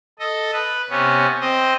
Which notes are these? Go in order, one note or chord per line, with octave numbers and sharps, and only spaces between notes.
A4 D#5
B4
C3 B3 C#4
C4 D#5